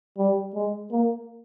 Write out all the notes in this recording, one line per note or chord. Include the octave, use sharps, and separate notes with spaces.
G3
G#3
A#3